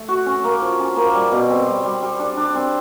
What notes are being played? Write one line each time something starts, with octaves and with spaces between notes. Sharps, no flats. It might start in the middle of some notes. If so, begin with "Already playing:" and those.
Already playing: A3
F#4
C#4
A#3
F3
C#4
A#3
G3
B2
C4
G3
G3
G3
D4
D4
C4